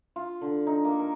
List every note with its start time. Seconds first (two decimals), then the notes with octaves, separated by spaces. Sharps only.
0.16 F4
0.41 D3
0.67 D#4
0.85 A#3
1.00 A#4